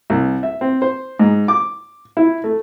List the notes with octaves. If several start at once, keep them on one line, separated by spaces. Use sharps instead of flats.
C2
E5
C4
C5
G#2
D6
E4
A3